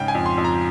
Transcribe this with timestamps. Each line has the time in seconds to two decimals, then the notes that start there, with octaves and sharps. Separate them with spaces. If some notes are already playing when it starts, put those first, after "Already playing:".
Already playing: G#2 C#3 G5
0.08 G#5
0.15 F2
0.26 C6
0.38 F2
0.44 A#5